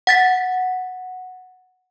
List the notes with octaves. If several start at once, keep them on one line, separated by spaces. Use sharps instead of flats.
F#5 A6 B6